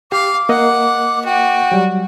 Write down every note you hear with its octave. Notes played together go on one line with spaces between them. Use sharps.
G4 F5 D6
A#3 D#5 F#5
F#4 G5
F#3 G3